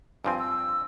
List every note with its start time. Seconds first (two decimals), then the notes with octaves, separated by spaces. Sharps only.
0.25 G2 F3 C4 G#5
0.39 E6